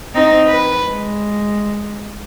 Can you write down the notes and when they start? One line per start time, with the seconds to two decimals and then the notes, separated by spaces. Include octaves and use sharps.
0.14 C4 D#4
0.47 B4
0.86 G#3